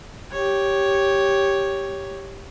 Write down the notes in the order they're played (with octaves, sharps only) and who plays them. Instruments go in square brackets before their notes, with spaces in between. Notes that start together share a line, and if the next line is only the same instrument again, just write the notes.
[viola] G4 C#5